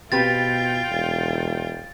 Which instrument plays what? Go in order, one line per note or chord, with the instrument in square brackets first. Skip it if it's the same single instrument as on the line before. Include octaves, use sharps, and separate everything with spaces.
[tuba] B2 [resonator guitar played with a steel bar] C4 G4 B4 [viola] F4 G5 [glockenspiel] A6
[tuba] E1